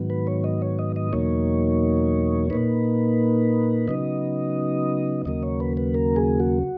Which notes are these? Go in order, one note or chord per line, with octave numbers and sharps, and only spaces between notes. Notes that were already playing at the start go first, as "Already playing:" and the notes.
Already playing: G#2 D#3 F#3 B3
B4
C#5
D#5
C#5
D#5
D#5
E2 B2 F#3 A#3 D#4 C#5
A#2 A#3 D#4 B4
C#3 F#3 B3 D#4 D#5
D#2 C#3 F#3 A#3 D#5
C#5
B4
B4
A#4
G#4
F#4